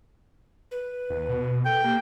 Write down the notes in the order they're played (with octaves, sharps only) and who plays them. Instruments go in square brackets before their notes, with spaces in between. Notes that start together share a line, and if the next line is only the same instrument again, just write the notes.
[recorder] B4
[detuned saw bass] D#2
B2
[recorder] A4 [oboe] G5
[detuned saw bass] A#3 [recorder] G4